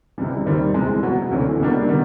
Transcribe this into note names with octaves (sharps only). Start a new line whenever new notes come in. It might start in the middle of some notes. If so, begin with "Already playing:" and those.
C#2 C3 E3 G3
D#2 D#3 G3 C4
F2 C3 E3 G#3
B2 F#3 B3
D2 C3 E3 A3 C#4
C#2 B2 G3 A#3 D4
D#3 G3 B3